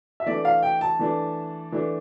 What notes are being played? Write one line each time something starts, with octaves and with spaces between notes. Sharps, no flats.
E5
E3 A3 D4 D5
F5
G5
A5
E3 A3 D4
E3 A3 D4